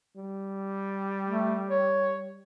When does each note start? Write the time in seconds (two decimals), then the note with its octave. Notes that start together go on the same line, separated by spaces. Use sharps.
0.17 G3
1.25 A3
1.69 C#5